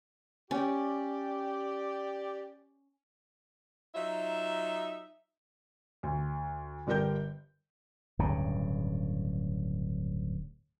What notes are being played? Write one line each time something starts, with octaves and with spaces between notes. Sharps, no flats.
C#4 G4 D5
F#3 D#4 F4 E5
D2
G1 D3 G3 A#4 G5 G6
D1 G2 C#3